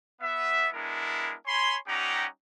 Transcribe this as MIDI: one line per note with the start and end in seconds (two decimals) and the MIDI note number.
0.21 0.69 59
0.21 0.69 76
0.73 1.34 56
0.73 1.34 59
0.73 1.34 62
0.73 1.34 64
0.73 1.34 70
1.47 1.77 73
1.47 1.77 80
1.47 1.77 83
1.47 1.77 84
1.87 2.26 55
1.87 2.26 61
1.87 2.26 63
1.87 2.26 67
1.87 2.26 78
1.87 2.26 82